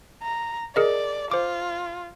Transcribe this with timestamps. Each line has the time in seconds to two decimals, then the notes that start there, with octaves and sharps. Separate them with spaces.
0.23 A#5
0.76 G#4 A#4 D5 D#5
1.31 F4 C5 D6